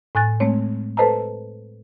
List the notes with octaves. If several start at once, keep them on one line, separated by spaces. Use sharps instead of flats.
A2 G#5 F#6 A6
G#3 A3 C4 C#5
A4 B4 C5 D#5 A5 A#5